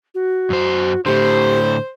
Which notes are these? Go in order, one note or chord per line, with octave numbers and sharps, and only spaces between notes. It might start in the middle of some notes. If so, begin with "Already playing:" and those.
F#4
F#2 C5
A2 D3 G4 C5